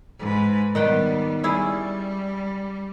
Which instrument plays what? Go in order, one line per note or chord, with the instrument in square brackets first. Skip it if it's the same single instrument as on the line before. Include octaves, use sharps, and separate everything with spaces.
[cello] G#2 B4
[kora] D#3 F#5 G5 [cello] G3 B3
[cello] G3 [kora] C#4 E4 G#4